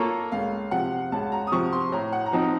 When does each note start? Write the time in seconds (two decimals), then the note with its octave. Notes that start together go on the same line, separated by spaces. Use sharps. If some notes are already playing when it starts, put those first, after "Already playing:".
Already playing: A#3 F4 A4 C#5 A#5
0.32 C#2 F5
0.71 C3 F3 F#5
1.12 C#2 A5
1.32 A#5
1.47 D#6
1.52 C3 F3 C#6
1.72 C6
1.92 A2 A#5
2.12 F#5
2.26 A#5
2.32 F3 C4 D#4 A5